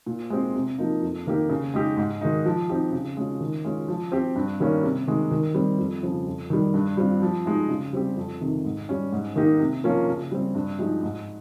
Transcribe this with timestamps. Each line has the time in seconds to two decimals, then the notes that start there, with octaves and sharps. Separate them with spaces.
0.06 A#2
0.30 G#3 C4 G4
0.54 C3
0.79 F3 A#3 D#4
1.02 F2
1.27 D#3 A#3 D#4 G4
1.50 C#3
1.74 G#3 D#4 G4
1.97 G#2
2.21 D#3 G#3 D#4
2.45 F3
2.69 C4 D#4 G4
2.93 C#3
3.17 G#3 C#4 F4
3.40 D#3
3.65 G#3 C#4 F4
3.88 F3
4.12 C4 G4
4.36 G2
4.60 D#3 G3 A#3 C#4
4.83 C3
5.07 D#3 G#3
5.31 D#3
5.54 G3 C4
5.78 F2
6.03 C#3 F3 C4
6.27 F2
6.50 D#3 G3
6.74 G2
6.97 G3 C4 F4
7.22 F3
7.46 G#3 D#4
7.69 C#3
7.93 G3 C4 G4
8.17 F2
8.41 C3 D#3
8.65 G#2
8.89 G3 C#4
9.13 G#2
9.36 D#3 A#3 D#4 G4
9.59 C3
9.84 F3 A#3 C#4 F4
10.07 C#3
10.31 G3 C4
10.55 G2
10.79 F3 G#3 D#4 G4
11.03 G#2